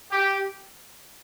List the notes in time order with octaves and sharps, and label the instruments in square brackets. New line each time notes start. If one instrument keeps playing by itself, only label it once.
[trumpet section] G4